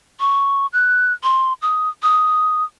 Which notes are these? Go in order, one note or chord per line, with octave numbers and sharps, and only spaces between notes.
C#6
F#6
C6
D#6
D#6